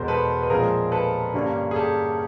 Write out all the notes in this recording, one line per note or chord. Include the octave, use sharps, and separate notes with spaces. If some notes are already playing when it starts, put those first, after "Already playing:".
Already playing: E2 B2 G#3 B3 A#4 C5
A4 B4
B4
A#2 F3 G#3 C4 G#4 A#4
A4 B4
G2 D3 G3 A#3 C#4
G#4
G4 A4